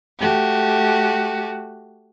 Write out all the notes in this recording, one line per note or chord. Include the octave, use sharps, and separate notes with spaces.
A3 F#4 G4